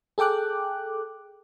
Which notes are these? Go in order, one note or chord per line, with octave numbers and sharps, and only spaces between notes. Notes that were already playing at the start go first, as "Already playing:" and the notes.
G#4 A4 G5 D6 F#6